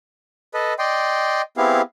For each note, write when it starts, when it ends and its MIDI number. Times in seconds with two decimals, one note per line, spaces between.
0.54 0.74 69
0.54 0.74 71
0.54 0.74 75
0.79 1.42 74
0.79 1.42 75
0.79 1.42 79
0.79 1.42 84
1.57 1.81 59
1.57 1.81 60
1.57 1.81 64
1.57 1.81 67
1.57 1.81 68
1.57 1.81 77